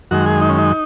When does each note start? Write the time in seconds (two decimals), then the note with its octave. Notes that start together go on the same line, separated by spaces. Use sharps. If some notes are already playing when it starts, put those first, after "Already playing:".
0.11 F#2 D#3 G#3 F#4
0.26 G#4
0.41 D#4
0.49 C#4
0.58 D#4